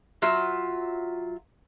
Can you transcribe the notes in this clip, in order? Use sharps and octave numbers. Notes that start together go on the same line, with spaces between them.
F#3 F4 E5